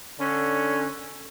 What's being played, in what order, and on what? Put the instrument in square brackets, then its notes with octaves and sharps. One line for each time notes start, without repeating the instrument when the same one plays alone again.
[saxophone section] D3 C#4